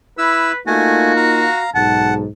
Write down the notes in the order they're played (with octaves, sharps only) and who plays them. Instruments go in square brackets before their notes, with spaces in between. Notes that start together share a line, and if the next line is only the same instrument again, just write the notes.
[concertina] E4 E6 [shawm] B4
[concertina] A3 G#5 [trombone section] A#3 D#4 F4 [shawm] F#4
[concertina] F5 A#5
[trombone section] B1 G#2 [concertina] F#5 [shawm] A5